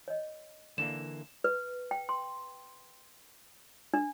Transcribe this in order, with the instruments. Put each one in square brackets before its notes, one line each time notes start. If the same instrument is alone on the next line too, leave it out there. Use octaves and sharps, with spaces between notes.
[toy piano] C#5 D#5
[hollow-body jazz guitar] D3 E3 A#3 [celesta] E7
[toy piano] B4
G5
C6
D4